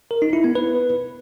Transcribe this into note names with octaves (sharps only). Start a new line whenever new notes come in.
A#4
D#4
E4
B3
B4